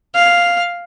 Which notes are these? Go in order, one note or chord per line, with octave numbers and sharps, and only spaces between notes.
F5